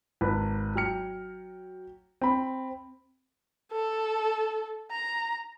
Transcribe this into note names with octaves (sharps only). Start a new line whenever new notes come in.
G#1 B4
F#3 G5 F6 C#7
C4 B5
A4
A#5